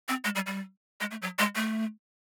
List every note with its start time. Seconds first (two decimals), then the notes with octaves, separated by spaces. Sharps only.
0.08 C4
0.24 G#3
0.35 G3
0.46 G3
1.01 G#3
1.11 A3
1.22 F#3
1.39 G#3
1.55 A3